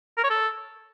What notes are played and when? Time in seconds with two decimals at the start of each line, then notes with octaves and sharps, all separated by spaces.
0.17 A#4
0.24 C#5
0.30 A4